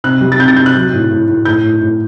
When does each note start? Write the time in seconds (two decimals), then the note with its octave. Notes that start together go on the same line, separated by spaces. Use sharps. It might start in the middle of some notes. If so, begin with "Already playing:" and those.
0.04 C3 F#6
0.21 G3
0.32 A6
0.39 C3 G6
0.48 A6
0.56 C3 G6
0.66 F#6
0.74 F#3
0.93 A2
1.11 A2
1.27 A2
1.45 A2 G6
1.63 A2
1.81 A2